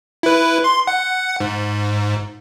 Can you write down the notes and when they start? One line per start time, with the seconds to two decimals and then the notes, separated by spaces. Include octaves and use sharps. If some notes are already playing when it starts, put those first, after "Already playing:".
0.23 E4 B4
0.64 C6
0.87 F#5
1.40 G#2